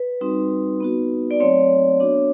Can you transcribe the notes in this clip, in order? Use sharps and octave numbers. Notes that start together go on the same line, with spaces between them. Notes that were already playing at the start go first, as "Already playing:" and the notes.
Already playing: B4
G3 C4 D#4 F#4
B3 D#4 F#4
D5
F#3 A3 C4 C#5
B3 D4 F#4